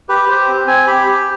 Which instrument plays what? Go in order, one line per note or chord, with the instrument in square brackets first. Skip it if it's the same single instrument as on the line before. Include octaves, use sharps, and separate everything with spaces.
[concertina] G4 B4
G4 C5
C4
C4 G#5
G4 B5
G4